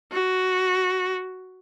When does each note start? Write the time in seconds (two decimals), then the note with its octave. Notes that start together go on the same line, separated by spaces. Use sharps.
0.12 F#4